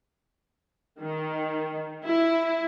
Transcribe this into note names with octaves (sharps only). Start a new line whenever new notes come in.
D#3
E4